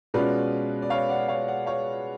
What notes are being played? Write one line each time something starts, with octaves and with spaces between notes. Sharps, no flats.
B2 G#3 C#4 F4 B4 D5
D5
C#5 F5
D5 F#5
C#5 F5
D5 F#5
C#5 F5